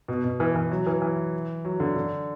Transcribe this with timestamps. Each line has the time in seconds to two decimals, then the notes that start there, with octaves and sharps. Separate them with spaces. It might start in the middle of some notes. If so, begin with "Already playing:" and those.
0.08 B2
0.24 B2
0.40 E3
0.56 E3
0.71 F#3
0.87 E3
1.02 E3
1.65 F#3
1.80 D3
1.96 D3